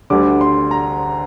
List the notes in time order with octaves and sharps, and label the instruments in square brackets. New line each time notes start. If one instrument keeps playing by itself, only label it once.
[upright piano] D2 D3 G3 D6
C6
A#5